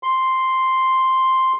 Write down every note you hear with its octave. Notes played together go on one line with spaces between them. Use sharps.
C6